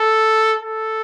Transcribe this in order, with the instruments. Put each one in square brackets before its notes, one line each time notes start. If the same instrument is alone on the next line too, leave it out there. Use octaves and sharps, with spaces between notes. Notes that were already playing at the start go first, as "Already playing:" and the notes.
Already playing: [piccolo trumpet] A4
A4